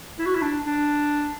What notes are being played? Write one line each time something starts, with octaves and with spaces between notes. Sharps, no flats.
E4
F#4
E4
D4
D4